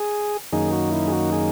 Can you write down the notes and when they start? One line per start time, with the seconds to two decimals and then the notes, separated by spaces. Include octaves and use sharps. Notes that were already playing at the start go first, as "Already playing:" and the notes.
Already playing: G#4
0.53 F#2 D#3 A#3 D#4 G#4
0.72 F#4
0.92 E4
1.07 G#4
1.12 F#4
1.32 G#4